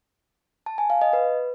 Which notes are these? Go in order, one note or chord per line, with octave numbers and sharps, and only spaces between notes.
A5
G#5
F5
D#5
B4